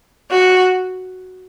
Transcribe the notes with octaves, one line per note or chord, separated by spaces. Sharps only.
F#4